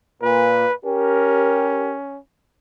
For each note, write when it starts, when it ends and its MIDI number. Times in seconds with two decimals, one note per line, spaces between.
0.22 0.66 46
0.22 0.73 71
0.85 2.19 61
0.85 1.96 67
0.85 1.96 70